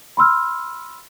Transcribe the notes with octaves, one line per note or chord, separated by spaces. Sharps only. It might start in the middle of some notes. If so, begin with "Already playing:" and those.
B5 C6 E6 F6